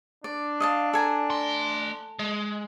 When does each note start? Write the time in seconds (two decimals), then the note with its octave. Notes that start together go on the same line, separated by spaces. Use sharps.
0.24 D4 D5
0.60 D#5 F5 A5
0.93 A4 G#5 A#5
1.30 A3 C6
2.19 G#3